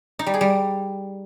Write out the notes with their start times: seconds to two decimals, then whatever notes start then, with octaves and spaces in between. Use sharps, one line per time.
0.19 D#4
0.26 G3
0.34 G#4
0.41 G3